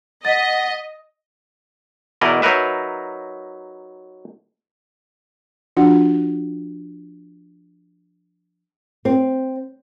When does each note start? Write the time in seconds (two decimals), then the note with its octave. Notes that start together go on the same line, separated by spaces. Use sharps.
0.25 D#5 F#5 A6 B6
2.21 E2 B2 E4 A#4 D5 D#5
2.42 F#3 D#4 A#4 B4 E5
5.76 F3 D4 F4 F#4 F#5
9.05 C4